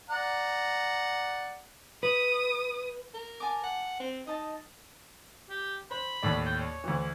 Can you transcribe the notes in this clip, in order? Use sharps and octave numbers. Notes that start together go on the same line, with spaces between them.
D5 F#5 A#5
B4 D#6
A#4
G#5 A5 D6
F#5
C4
D#4 D#5 A5
G4
C5 B5
D#2 A2 D5
G5
C#5
D2 E3